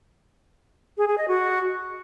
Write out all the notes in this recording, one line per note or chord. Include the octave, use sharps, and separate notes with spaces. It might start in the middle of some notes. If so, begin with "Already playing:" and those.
G#4
G#4
D#5
F#4